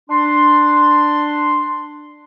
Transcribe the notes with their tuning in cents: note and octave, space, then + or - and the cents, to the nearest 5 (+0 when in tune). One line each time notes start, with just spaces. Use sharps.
D4 +10 C6 +0